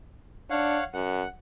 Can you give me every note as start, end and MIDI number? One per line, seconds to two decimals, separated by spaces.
0.50 0.79 62
0.50 0.84 73
0.50 0.84 77
0.50 0.84 78
0.94 1.23 42
0.94 1.28 78